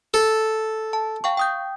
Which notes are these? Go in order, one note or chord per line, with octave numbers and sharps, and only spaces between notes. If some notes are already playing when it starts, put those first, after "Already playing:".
A4
A5
F5 G5 C#6
G5 D#6 G6